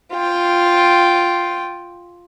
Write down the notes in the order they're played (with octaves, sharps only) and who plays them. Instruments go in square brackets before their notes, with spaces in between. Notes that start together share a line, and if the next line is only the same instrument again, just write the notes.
[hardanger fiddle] F4 G5